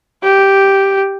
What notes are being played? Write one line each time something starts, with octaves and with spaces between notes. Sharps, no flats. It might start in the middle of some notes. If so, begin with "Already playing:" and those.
G4